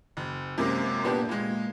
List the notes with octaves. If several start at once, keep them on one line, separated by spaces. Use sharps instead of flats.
F#1
F#2 C3 G#3 A#3
A#2 B3 D4 G4
A#2 G#3